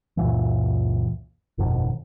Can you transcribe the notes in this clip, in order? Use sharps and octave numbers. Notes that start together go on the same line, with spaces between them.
C#2 F#2 A#2 E3
G1 F2 B2 D#3